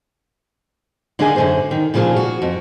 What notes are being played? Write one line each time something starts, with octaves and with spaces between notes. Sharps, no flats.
D3 A#3 D4 D#4 G#4 G#5
F#2 D3 C5
D#3
A#2 C#3 F3 A#3 F4 G#4
F#4
F2